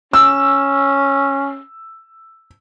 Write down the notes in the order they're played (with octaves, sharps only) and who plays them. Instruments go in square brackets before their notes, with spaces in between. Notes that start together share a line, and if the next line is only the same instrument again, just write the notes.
[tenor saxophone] C#4 [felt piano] E6